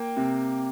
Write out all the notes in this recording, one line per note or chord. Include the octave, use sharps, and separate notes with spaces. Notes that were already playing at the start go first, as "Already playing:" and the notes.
Already playing: A#3 G5
C3